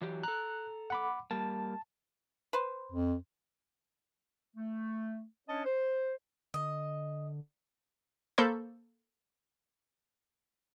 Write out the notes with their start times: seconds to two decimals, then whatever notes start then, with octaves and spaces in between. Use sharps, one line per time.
0.01 E3 F#3 G4
0.23 A4 A#5 F#6
0.90 F#5 B5 D6
1.31 G3 A#3 A5
2.53 B4 C5
2.92 F2
4.55 A3
5.48 C#4 D4 C#5 D#5 A5
5.65 C5
6.54 D3 D#5
8.38 A#3 A4 C5 B5 C#6 G6